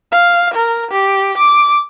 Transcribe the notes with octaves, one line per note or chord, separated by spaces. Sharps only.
F5
A#4
G4
D6